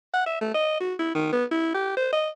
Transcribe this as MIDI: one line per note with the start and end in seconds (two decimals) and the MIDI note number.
0.13 0.26 78
0.26 0.39 76
0.41 0.49 57
0.54 0.78 75
0.81 0.94 66
0.99 1.12 64
1.15 1.28 51
1.33 1.45 59
1.51 1.72 64
1.74 1.93 67
1.97 2.10 72
2.13 2.29 75